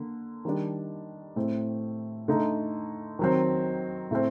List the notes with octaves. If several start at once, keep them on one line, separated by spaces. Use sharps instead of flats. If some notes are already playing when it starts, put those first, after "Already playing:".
Already playing: D3 A#3
D#3 G3 D4
A2 A3 C4
D3 A3 D#4
D#3 F#3 C4
A2 A3 C4